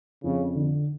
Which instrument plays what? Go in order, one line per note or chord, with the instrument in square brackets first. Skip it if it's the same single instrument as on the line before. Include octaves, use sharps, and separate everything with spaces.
[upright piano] F2 [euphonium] C#3
[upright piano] D3